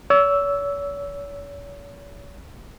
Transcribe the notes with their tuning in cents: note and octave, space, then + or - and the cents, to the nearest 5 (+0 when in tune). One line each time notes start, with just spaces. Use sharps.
C#5 +40 E6 +0